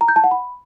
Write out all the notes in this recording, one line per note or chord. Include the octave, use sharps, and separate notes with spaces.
A#5
G6
A5
F#5
B5